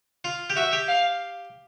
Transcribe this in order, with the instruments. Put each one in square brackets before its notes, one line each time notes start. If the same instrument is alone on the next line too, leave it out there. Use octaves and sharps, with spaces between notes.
[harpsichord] F4
G4
[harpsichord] F#4 [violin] E5
[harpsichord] G4
[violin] F5